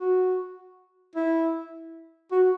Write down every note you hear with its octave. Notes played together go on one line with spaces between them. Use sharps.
F#4
E4
F#4